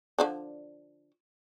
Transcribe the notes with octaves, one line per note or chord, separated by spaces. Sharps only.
D3 F3 D4